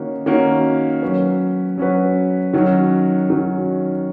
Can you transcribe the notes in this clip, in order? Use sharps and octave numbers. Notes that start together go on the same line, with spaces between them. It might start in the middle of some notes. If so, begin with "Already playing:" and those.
Already playing: D#3 A#3 C#4 F#4
D#3 A#3 C#4 F#4
F#3 C#4 F#4 B4
F#3 C#4 F#4 B4
D#3 F#3 C#4 F#4
D#3 F#3 C#4 F#4